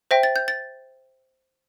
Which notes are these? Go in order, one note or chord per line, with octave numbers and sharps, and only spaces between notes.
C5 E5 G5 A#6
A6
G6
A6